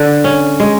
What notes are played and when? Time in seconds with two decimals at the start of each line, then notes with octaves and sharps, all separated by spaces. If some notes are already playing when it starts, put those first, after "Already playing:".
Already playing: D3
0.24 C#4
0.60 G#3